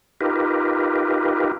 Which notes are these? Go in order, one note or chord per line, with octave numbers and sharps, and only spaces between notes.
D#4 F4 G4 A#4 B4